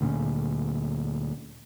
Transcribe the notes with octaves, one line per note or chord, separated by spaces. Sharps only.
D2 A#2 G3 C#4